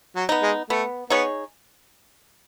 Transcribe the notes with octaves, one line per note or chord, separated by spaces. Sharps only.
F#3
B3 D#4
G#3
A3 B3
B3 D#4 G#4 C#5